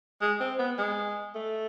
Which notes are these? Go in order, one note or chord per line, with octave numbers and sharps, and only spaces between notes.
G#3
C4
B3
G#3
A3